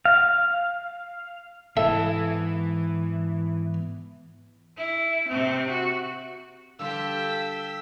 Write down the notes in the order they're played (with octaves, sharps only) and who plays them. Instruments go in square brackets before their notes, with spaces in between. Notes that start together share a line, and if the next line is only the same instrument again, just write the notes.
[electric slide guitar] F5
[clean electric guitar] G#2 B3 [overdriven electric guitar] E3 [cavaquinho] A4 [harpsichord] E5
[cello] E4
C3 C4
F#4
[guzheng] D3 G3 F4 [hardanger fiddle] A4 G5 [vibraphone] F5 [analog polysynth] E6 B6